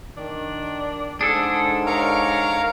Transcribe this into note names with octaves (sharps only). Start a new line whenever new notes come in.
D#3 D4
G#2 D4 G#4 A4
A#4 C#5 F5 A#5